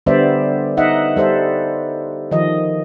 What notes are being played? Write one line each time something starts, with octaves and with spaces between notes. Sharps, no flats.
D3 G3 B3 C5 D5 E5
D#4 D#5 E5 F#5
G3 A4 C5 E5
D#3 F3 D#5